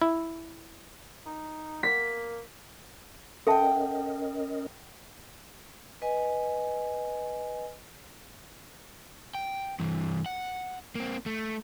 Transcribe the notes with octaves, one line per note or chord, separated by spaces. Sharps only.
E4
D#4
A#3 B6
C#4 A4 A#4 D#5 E5 F#5 G5 A5
B4 D#5 G#5
G5
G2 E3
F#5
A#3 C4
A3